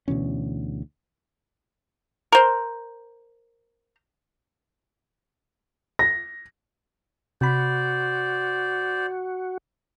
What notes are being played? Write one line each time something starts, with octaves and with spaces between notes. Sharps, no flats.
D2 B2 E3 C#4
A#4 C5
A#6
C3 F#4 C5 D5 B5